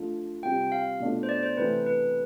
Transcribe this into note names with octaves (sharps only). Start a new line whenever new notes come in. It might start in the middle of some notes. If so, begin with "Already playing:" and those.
Already playing: F3 A3 D4 F4
C3 G3 C4 F4 G5
F5
B2 A3 D4 F4
C5
D5
C5
C3 E3 A3 E4 B4
B4